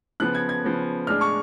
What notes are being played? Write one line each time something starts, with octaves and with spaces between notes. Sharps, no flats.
C#3 F3 B3 F#6
G#6
G#6
C#3 F3 B3
A2 G#3 D4 F6
C#6